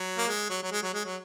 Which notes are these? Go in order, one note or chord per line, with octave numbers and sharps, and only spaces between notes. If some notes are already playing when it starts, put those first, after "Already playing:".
Already playing: F#3
A#3
G#3
F#3
F#3
G#3
F#3
G#3
F#3